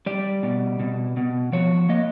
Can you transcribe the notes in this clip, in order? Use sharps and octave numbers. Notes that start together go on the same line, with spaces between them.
G3 D5
B2
B2
B2
F3 C#5
A#3 D#5